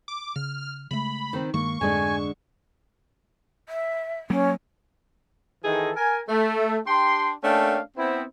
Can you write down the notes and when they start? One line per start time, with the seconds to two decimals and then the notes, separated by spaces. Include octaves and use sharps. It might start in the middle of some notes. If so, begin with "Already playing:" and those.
0.08 D6
0.36 C#3 F6
0.91 C#3 G#3 A3 B5
1.33 D#3 C4
1.54 G2 D#3 G#3 A#3 C#6
1.81 F2 G#2 D3 G#3 D4 G#5
3.69 E5
4.30 F#3 A#3 C#4
5.64 D#3 E3 D#4 G#4 A4
5.96 A#4 G#5
6.29 A3
6.87 D4 G4 G5 C6
7.43 A3 A#3 C#4 D4 F5 G5
7.97 B3 C4 E4